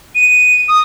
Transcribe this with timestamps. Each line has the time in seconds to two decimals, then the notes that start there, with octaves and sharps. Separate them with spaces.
0.15 D#7
0.68 D#6